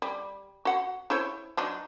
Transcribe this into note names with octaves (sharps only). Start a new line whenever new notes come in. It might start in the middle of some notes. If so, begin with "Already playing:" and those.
G3
F#4 F#5
E4 C5 C#5
F#3 D4 D#4